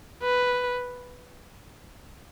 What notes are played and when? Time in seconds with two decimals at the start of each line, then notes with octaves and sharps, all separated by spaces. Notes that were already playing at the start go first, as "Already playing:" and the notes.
0.23 B4